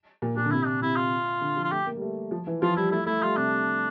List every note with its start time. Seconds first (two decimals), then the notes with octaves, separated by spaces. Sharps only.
0.22 A#2
0.36 A#2 D4
0.45 D3
0.51 C3 E4
0.67 D4
0.81 C3 E4
0.96 F4
1.41 D3
1.56 F3
1.64 F4
1.71 A3 G4
1.87 A#3
1.96 G3
2.02 A3
2.31 F3
2.47 E3
2.62 F3 F4
2.76 G3 E4
2.91 A3 E4
3.06 A3 E4
3.22 G3 F4
3.37 C3 D4